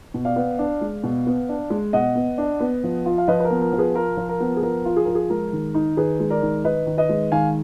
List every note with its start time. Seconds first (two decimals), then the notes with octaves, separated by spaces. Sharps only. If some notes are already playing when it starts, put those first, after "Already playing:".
0.14 B2
0.25 D5 F5
0.36 B3
0.59 D4
0.81 G#3
1.03 B2
1.27 B3
1.49 D4
1.70 G#3
1.93 B2 D#5 F#5
2.15 B3
2.38 D4
2.60 B3
2.84 F3
3.06 F4
3.18 F5
3.28 F3 B4 D#5
3.40 B4
3.45 A#4
3.51 B3
3.61 A#4
3.73 F3
3.78 G#4 B4
3.95 F4 A#4
4.17 F3
4.29 A#4
4.40 B3
4.57 G#4
4.62 F3 A#4
4.85 F4
4.96 G#4
5.05 F3 A#4
5.15 G#4
5.30 G#3 A#4
5.53 D#3
5.74 D#4
5.97 D#3 G#4 B4
6.20 G#3
6.30 A#4 D5
6.42 D#3
6.64 D#4 B4 D#5
6.87 D#3
6.98 B4 D#5
7.09 G#3
7.32 D#3 F5 G#5